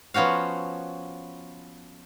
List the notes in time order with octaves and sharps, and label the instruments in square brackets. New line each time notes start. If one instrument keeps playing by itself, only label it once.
[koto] F3 B3 C#4 F#4 F5